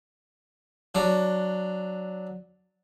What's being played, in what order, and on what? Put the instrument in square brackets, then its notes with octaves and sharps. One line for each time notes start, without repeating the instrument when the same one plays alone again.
[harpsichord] F#3 D4